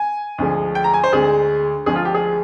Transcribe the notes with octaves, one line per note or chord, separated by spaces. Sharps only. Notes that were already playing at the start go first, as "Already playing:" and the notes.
Already playing: G#5
D2 D3 F3 G#3
G5
A#5
G#5
C5
D2 D3 G#3 G#4
D2 D3 F3 G#3 G#4
F4
G4
G#4